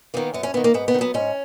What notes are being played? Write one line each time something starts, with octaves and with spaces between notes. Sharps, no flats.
D#3 A#3 B3
F#2 B3
C#4
A#3 B3
D#3
A#3
G#2 B3
B3
D#3
F#3 B3
G#2 C#4